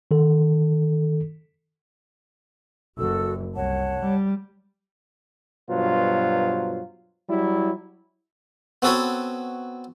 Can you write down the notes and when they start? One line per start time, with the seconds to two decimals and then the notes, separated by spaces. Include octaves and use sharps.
0.11 D#3 A4
2.98 F#1 F#4 A4 E6
3.55 C2 C#5 F#5 A5
4.00 G3
5.70 G2 B2 F#3 F4 C5
7.29 F#3 G3 E4
8.82 B3 C4 F#4 A4 B4 C#5